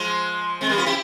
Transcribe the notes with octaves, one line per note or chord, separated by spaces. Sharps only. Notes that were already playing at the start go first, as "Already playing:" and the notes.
Already playing: F3 G#3
G#3 C4
G3 A#3
C#4 F4
E4 G4